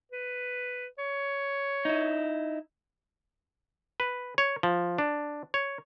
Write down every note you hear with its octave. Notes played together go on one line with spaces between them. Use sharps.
B4
C#5
D#4 E4
B4
C#5
F3
D4
C#5